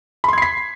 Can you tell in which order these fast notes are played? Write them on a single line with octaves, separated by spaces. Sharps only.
B5 C6 G#6 C7 B6